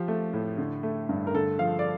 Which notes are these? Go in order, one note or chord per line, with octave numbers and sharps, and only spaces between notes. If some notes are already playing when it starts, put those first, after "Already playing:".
Already playing: F3 G4
A3
A2
D3
A3
G2
A#4
D3 A4
F3 F5
D5